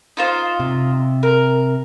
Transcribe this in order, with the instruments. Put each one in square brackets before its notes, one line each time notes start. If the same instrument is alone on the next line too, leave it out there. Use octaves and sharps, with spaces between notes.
[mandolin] D#4 F4 C5
[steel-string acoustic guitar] C3
[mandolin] A#4